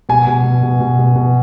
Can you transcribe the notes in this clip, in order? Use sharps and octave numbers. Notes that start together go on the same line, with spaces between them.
B2 G#5
B2
B2
B2
B2
B2
B2